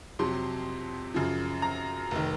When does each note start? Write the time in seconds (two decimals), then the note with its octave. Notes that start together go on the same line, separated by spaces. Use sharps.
0.19 F2 C3 F#3 C6
1.14 F#2 C#3 F3
1.62 A#5
2.11 F1 D#3